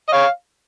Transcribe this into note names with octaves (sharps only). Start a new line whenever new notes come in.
D#5
C#5 F5